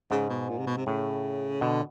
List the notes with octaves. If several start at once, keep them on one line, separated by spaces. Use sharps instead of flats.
G#2 C#3
B2
A#2
C3
B2
C3
A2 C#3
B2 D3